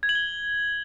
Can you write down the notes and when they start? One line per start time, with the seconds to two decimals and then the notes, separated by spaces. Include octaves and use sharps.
0.03 G#6
0.09 F#7
0.15 G7